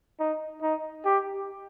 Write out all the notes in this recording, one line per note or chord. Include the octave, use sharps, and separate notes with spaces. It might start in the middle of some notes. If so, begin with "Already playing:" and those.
D#4
D#4
G4